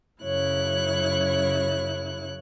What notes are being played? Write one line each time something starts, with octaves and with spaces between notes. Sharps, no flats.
F#2 C#3 F#3 E4 C#5 F#6